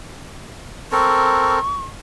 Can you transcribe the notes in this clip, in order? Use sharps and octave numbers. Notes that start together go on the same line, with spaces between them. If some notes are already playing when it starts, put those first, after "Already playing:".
C4 A4 A#4 C#6